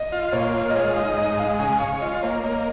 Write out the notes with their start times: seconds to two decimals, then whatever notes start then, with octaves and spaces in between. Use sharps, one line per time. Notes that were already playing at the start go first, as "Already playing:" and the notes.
Already playing: D#5
0.12 F4
0.32 A#2 C#5
0.54 F4
0.70 D#5
0.75 G#3 C#5
0.96 D#4 D#5
1.17 G#2 D#5
1.38 G#3 F5
1.59 C#3 G#5
1.80 C#5 F5
2.01 F4 D#5
2.23 A#3 C#5
2.44 A#3 D#5